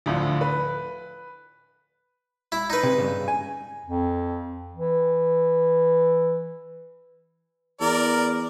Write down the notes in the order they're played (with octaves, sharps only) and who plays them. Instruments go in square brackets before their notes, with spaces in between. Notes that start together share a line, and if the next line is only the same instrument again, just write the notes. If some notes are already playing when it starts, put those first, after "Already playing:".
[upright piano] D2 A2 D3 F3
B4
[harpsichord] E4
D#4 B4
[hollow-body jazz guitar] C3
G2 A#2 C#3
G#5
[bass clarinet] F2
E3
[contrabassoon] E2 [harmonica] A#4 D5